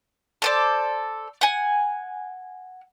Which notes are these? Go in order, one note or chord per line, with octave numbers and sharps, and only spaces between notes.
A4 C5 D5
F#5 G#5